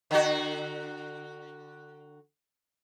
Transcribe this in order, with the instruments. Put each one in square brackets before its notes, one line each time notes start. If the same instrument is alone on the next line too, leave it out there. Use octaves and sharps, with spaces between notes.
[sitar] D3 F#4